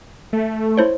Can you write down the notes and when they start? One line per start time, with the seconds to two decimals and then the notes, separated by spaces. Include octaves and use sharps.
0.33 A3
0.78 E4 C5 C#5